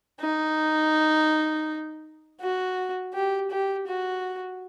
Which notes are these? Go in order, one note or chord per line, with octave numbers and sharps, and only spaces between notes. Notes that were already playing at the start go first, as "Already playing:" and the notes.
D#4
F#4
G4
G4
F#4